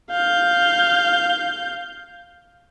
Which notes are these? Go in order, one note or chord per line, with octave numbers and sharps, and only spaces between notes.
F5 G6